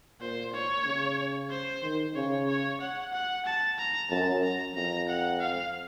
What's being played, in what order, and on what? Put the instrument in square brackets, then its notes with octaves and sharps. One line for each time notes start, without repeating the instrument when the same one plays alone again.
[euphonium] A#2 [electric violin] C5
[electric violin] C#5
[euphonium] C#3
[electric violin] C5
[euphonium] D#3
[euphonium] C#3 [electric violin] C#5
[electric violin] C#5
F#5
F#5
A5
A#5
[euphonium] F#2 [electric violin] A5
[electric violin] A#5
[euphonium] F2 [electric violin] A#5
[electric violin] F#5
F5